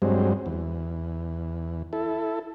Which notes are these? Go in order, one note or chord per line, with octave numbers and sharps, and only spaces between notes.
G2 F#3 G#3 C4
E2
E4 A4